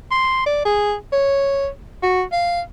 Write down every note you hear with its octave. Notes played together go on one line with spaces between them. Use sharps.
C6
D5
G#4
C#5
F#4
F5